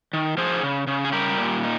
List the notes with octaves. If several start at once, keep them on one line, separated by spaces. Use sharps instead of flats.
D#3
F3 G#4 C5
C#3
C#3
G#4
G3 G4 A#4
A#2
D#4